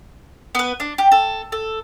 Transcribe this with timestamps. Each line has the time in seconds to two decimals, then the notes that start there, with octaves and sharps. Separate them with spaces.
0.55 B3 B4
0.80 D4
0.98 G4
1.12 A4
1.52 A4